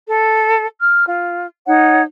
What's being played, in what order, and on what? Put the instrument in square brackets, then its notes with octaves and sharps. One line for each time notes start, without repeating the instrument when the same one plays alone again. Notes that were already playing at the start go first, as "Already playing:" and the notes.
[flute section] A4
F6
F4
D#4 C#5 F#5